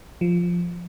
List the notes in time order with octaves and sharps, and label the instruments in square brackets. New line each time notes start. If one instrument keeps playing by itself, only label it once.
[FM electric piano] F3